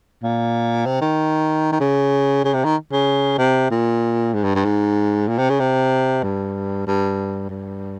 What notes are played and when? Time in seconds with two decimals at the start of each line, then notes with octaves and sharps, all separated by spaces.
0.23 A#2
0.86 C3
1.01 D#3
1.72 D#3
1.80 C#3
2.44 C#3
2.54 C3
2.65 D#3
2.92 C#3
3.38 C3
3.71 A#2
4.34 G#2
4.44 G2
4.55 G2
4.65 G#2
5.28 A#2
5.38 C3
5.50 C#3
5.60 C3
6.23 G2
6.87 G2
7.49 G2